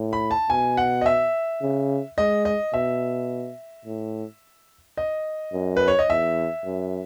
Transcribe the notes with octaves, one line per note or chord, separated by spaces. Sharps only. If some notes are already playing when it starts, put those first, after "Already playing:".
Already playing: A2
B5
A5
B2 G#5
F#5
D#5
E5
C#3
G#3 D#5
D#5
B2 E5
A2
D#5
F#2
B4
C#5
D#5
E2 E5
F#2